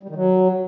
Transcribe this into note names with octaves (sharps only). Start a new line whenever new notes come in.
G3
D#3
F#3